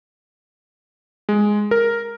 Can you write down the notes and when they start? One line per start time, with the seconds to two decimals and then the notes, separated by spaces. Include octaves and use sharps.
1.29 G#3
1.71 A#4